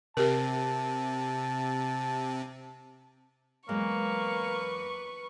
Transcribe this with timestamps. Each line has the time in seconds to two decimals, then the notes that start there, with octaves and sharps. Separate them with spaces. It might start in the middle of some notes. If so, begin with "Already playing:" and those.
0.17 C3 G4 A#4 A5
3.69 E2 F#3 G#3 A#3 B4 C#6